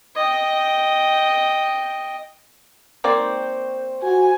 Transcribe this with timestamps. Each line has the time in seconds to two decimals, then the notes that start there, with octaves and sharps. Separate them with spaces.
0.16 D#5 G5
3.04 A#3 C4 C5 D5 G5 C#6
4.03 F#4 G#5